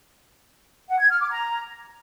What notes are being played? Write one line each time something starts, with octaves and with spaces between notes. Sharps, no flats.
F#5
G#6
F6
D6
A#5